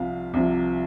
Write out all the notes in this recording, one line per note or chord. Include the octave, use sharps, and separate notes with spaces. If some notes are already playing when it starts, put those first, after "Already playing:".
Already playing: C2 C3 F3 F5
C2 C3 F3